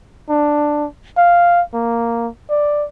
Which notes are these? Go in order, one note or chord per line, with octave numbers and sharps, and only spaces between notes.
D4
F5
A#3
D5